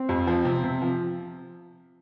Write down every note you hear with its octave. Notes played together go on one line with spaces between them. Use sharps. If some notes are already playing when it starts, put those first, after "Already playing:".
Already playing: C4
F2
F3
C3
C3
F3